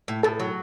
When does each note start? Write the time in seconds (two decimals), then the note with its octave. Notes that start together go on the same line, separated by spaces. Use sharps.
0.08 A2
0.23 A2 A4
0.40 F#3